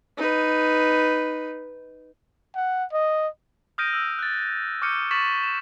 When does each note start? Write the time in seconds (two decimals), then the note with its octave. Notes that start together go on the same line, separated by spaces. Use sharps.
0.18 D#4 B4
2.55 F#5
2.93 D#5
3.78 D#6 F6 G6 A#6 D7 D#7
3.93 E6
4.19 F#6 A6
4.82 C#6 D6 F6 G6 C#7 D#7
5.11 C#6 A6 B6 E7 F#7
5.43 E7